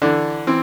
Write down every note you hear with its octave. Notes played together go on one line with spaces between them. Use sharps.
D3 E3 D4
E3 C4